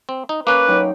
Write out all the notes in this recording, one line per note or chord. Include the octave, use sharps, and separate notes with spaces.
C4
D#4
A#3 C#4 B4 D6 F#6
F#3 D#4 G5